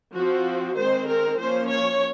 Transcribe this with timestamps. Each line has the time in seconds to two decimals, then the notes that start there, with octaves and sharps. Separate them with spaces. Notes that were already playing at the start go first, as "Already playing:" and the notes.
0.14 F3 C4 F#4
0.76 D#3 G#3 C4 C5
1.08 A#4
1.39 F3 A#3 C#4 C5
1.69 C#5